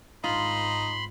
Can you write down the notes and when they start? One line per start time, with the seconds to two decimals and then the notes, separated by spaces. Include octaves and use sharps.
0.24 G#1 G#2 D#4 F4 B5 C6